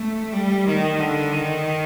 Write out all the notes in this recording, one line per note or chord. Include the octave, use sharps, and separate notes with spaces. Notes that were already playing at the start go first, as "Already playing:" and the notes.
Already playing: A3
G3
D#3
D3
D#3